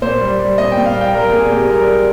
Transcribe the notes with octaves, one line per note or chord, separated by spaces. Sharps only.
A#2 C5
G3
G3
A#2 D#5
G5
A#2
F5
G3 G5
G3 A#4
A#2 G#4
A#2 G4
G3 A#4
G3